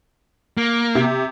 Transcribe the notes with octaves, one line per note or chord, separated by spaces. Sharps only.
A#3
C3